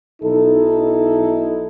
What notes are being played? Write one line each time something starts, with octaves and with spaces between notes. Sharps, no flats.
B1 D#4 E4 A4